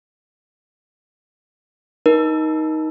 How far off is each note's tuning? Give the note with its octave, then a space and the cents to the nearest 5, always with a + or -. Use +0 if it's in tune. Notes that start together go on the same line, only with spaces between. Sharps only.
D#4 +10 A#4 +30